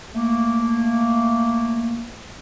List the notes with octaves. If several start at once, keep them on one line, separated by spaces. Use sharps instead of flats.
A3 A#3